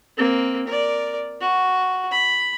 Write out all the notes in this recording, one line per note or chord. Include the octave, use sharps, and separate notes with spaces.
A#3 C4
A#4 D5
F#4
B5